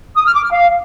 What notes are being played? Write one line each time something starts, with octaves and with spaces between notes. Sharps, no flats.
D#6
F6
D6
F6
F5